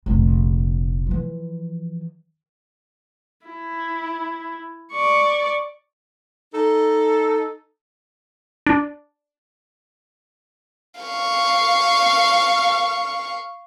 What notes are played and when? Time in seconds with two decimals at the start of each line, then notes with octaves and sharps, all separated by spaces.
0.06 F1 A#1
1.07 E3 F3
3.46 E4
4.92 D5 C#6
6.54 D#4 A4
8.67 D4
11.01 F5 C#6